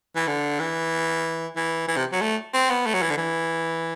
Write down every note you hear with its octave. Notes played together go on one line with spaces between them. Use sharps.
E3
D3
E3
E3
E3
C3
F#3
A3
C4
B3
A3
F#3
E3
D3
E3